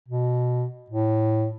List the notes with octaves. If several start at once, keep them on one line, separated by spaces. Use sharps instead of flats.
B2
A2